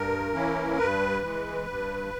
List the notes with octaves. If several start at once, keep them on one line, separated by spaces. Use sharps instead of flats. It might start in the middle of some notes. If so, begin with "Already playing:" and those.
Already playing: G2 A#4
E3 A#3 C#4 E4
G2 B4
E3 G#3
G2